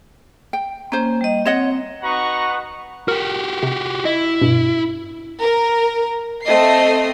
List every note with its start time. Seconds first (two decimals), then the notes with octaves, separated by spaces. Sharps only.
0.53 G5
0.92 A#3 C#4 C5
1.21 G3 D#5
1.46 C4 C#5 D#5 F#5
2.02 D#4 F#4 B4 F#5 A#5 C#6
3.08 F#4 G4 A#4
3.63 C3
4.05 E4 D#5
4.41 G2 B2
5.42 A#4
6.45 A3 C4 D#5 C7